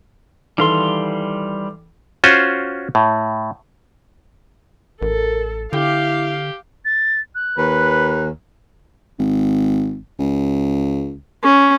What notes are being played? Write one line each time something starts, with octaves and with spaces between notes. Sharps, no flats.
D#3 E3 G3 A4 F5 C6
C#4 F4 F#4 C5 C#5
A2
A1 A4 A#4
D3 E4 G4 F5
A6
F#6
D#2 B4
G#1
C#2
C#4